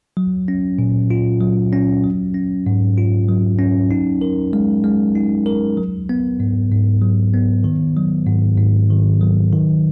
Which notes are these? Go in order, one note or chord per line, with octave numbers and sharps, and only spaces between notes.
F#3
C#4
A#2
F4
F#3
C#4
F#3
C#4
G#2
F4
F#3
C#4
D#4
A#4
G#3
G#3
D#4
A#4
F#3
B3
G#2
G#2
F#3
B3
D#3
F#3
G#2
G#2
D#3
F#3
D#3